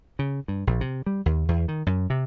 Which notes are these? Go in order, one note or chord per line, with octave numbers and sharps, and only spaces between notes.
C#3
G2
A#1
C3
G3
D#2
E2
D#3
F#2
C3